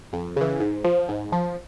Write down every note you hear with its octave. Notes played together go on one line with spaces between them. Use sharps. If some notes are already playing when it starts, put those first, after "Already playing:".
F2
C#3 E3
G#2
F3
G#2
F3